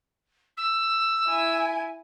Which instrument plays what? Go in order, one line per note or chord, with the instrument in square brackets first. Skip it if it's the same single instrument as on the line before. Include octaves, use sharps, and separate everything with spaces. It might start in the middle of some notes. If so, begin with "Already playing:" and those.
[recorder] E6
[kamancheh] E4 G#5